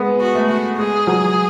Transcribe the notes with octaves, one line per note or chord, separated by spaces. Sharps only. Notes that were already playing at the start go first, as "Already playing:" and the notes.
Already playing: G#3 B3
F#4
A3
F#4
G#3 G#4
F#3